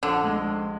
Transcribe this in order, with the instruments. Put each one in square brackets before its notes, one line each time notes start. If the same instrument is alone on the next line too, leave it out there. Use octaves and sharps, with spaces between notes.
[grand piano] A#1 [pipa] D3
[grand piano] G#3